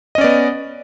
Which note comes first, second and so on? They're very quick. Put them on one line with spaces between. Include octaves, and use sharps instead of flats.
D#5 C#4 D5 B3